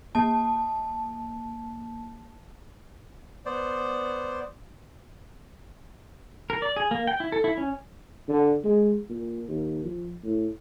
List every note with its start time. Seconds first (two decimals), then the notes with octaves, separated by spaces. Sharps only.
0.15 A#3 A5
3.46 B3 C5 D5
6.50 A#4
6.62 D5
6.76 G#4
6.91 A#3
7.07 G5
7.20 E4
7.32 A4
7.44 E4
7.58 C#4
8.28 D3
8.64 G#3
9.10 A#2
9.48 D#2
9.84 F3
10.24 A2